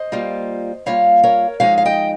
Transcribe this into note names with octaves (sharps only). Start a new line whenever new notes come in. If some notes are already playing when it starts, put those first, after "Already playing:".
Already playing: C5 D#5
G3 A#3 F4
G3 A#3 F4 C#5 F5
A#4 C#5
F3 G#3 D#4 C#5 F5
F5
D#5 G5